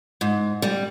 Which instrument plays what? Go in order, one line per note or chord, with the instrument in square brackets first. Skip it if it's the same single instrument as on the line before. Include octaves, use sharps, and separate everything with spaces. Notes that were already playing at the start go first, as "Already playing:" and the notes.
[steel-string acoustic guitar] G#2
G3